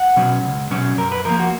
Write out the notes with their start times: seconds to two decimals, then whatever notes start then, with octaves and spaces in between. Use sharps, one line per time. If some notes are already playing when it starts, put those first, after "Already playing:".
Already playing: F#5
0.16 B2 F#3 C#4
0.44 C#2
0.70 B2 F#3 C#4
0.98 F#2 A#4
1.12 B4
1.25 F3 A#3 A#4
1.40 F#4